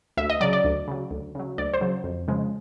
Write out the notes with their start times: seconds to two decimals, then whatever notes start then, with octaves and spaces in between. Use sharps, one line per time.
0.17 D2 E5
0.30 D#5
0.40 C#3 F#3 D5
0.53 D5
0.64 D2
0.88 C#3 F#3
1.11 D2
1.35 C#3 F#3
1.58 D2 D5
1.74 C5
1.81 C#3 F#3
2.04 F2
2.28 C#3 F3 G#3